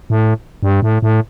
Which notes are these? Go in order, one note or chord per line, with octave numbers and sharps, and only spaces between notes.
A2
G2
A2
A2